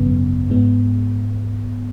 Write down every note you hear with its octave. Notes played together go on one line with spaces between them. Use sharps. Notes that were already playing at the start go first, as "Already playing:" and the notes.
Already playing: G#1 F#2 C#3 B3
G#2 G#3 B3